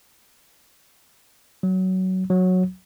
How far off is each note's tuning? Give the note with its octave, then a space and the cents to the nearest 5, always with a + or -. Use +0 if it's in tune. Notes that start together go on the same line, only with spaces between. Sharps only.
F#3 +15
F#3 -10